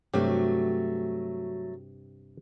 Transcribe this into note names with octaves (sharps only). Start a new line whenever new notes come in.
G2 C3 F#3 A3 F#4 G4